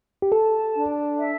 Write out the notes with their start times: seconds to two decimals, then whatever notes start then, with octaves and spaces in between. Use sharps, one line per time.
0.22 G4
0.32 A4 A5
0.75 D4
1.19 E5